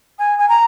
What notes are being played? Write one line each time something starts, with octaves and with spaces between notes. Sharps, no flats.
G#5
G#5
A#5